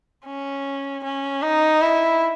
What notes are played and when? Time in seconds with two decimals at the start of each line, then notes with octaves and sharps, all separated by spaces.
0.25 C#4
1.04 C#4
1.42 D#4
1.81 E4